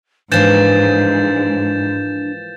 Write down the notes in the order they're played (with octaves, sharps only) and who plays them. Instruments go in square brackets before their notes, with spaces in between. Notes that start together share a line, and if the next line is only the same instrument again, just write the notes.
[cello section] G#2 [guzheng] E3 F3 A#3 [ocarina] D4 [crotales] G6 A6 E7